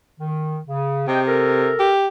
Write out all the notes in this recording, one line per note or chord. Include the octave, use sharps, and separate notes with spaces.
D#3
C#3
C3 G#4 D#5 G5
A4 A#4
G4